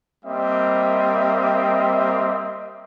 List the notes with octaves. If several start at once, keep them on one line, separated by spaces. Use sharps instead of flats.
G3 A#3 C4 D#5 E5